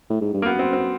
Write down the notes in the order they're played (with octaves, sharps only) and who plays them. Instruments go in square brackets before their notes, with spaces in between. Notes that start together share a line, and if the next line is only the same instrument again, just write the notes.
[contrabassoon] A2
G#2
G2
[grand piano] A#3
[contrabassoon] F#2 [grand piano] B3
[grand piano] C4
C4